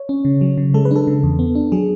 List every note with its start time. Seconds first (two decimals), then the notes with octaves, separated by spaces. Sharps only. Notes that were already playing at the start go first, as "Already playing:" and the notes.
Already playing: C#5
0.09 C#4
0.25 C#3
0.41 F#3
0.58 C#3
0.74 G#3 A4
0.85 B4
0.91 D4 A4
1.07 C#3
1.23 E2
1.39 B3
1.55 D4
1.72 F#3 G#4